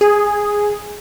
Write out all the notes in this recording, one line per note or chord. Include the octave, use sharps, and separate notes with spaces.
G#4